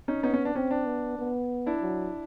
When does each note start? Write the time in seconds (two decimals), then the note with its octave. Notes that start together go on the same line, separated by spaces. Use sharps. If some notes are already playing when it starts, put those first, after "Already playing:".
0.08 C#4 D#4
0.23 B3 C#4 D#4
0.34 C#4
0.45 D4
0.55 C4 C#4
0.71 D4
0.87 B3
1.19 B3
1.66 D4 E4
1.82 F#3